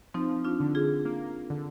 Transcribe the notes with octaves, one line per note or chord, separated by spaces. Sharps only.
F3 C4 D#4
D4 F4
D3
F4 G#4
A#3
D3